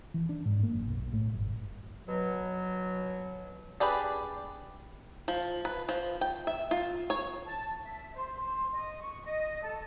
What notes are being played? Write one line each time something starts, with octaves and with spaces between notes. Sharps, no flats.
E3
D4
G#2
A#3
F#1
B1
A2
G1
B2 F#3
D4 G4 G#4 B4 D5
F3
B4
F3
G5
E5
F4
C#5
A5
E5
C5
C5
D#5
C#6
D#5
A4